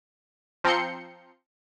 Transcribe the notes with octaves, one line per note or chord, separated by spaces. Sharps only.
F3 C4 A#5 C6 G6 C#7